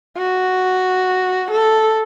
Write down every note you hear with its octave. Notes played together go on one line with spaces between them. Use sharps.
F#4
A4